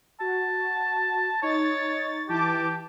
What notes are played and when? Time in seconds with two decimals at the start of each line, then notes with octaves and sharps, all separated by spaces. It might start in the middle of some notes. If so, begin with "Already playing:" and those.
0.20 F#4 A5
1.43 D#4 C#5 A6
2.29 E3 G4 A5 D6